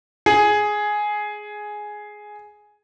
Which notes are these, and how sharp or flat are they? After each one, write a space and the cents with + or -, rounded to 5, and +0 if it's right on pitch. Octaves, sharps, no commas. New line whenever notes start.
G#4 +5